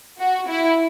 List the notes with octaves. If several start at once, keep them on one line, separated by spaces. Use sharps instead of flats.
F#4
E4